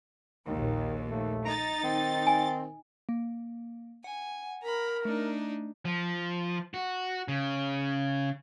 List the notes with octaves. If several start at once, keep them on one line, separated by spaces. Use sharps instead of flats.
A#1 D#2 D#3
A3
D#4 A#5 A6
D#3 C4
G#5
A#3
F#5 G#5
A#4 A#5 B5
A3 D4 D#4
F3
F#4
C#3